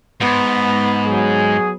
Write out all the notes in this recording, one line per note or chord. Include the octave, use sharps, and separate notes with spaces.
G#2 B3
F#3 G#4